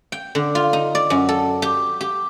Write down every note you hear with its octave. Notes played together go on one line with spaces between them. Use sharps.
G5
D3
F4
D#4
D5
F#2
A4
G4
G4